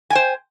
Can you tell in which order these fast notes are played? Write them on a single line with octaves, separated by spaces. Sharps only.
G#5 G5 C5